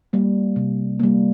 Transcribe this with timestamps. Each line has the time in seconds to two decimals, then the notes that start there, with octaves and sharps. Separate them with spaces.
0.13 G3 A#3
0.56 C3
1.00 G3 A#3